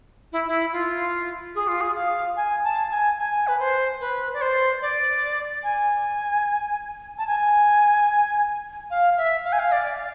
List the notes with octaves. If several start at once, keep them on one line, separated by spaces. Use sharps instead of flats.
E4
E4
F4
G#4
F4
G#4
F5
G#5
A5
G#5
G#5
B4
C5
B4
D5
C5
D5
G#5
A5
G#5
F5
E5
F5
G#5
F5
D5
F5